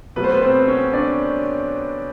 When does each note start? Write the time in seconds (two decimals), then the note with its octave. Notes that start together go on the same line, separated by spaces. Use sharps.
0.16 B2 F#3 A3 B4
0.24 C5
0.32 B3 B4
0.41 C4 C5
0.68 C#4 C#5
0.93 D4 D5